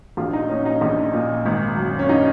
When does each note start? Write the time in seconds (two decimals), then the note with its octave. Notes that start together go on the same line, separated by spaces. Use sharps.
0.17 A#1 F4
0.33 D#4
0.49 A#2 C#4
0.65 D#4
0.81 A#1
1.13 A#2
1.45 G#1
1.77 F#2
1.99 C#4
2.09 D#4